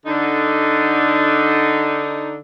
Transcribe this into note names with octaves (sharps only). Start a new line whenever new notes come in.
D3 D#4